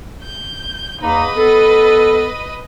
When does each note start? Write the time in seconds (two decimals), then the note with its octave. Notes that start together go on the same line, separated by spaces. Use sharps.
0.22 G6
1.02 E2 A#3 D#4 B4 D#5
1.36 B3 A4